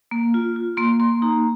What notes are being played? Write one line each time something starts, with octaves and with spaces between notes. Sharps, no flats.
A#3
F4
F4
A#3 C6
A#3 C6
D#4 A#5